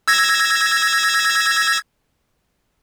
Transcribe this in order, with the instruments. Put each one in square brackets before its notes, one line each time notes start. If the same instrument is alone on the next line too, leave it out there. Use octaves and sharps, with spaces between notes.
[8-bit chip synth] E6 G#6 A#6